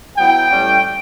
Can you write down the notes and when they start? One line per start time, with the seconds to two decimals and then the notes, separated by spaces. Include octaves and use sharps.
0.17 F#3 B3 E4 G5
0.51 A2 G3 C#4